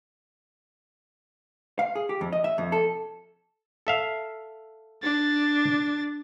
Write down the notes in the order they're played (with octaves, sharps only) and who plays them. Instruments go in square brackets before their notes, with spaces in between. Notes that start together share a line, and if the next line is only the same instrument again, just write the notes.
[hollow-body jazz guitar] F5
G#4
G4
F2
D#5
E5
F2
A4
[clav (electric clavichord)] A4 E5 F5
[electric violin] D4 A6